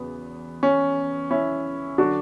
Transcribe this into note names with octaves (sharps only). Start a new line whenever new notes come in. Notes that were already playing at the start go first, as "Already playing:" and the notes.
Already playing: E2 C#3 F#3 B3
C#4
C#4 E4
D3 F#3 D4 F#4